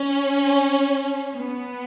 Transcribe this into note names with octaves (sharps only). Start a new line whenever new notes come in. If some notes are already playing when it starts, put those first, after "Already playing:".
Already playing: C#4
B3